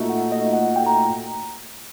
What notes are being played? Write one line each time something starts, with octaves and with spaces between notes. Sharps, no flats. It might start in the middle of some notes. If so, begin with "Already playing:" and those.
Already playing: A#2 A3 D#4 F#4
F#5
D#5
F#5
G5
A#5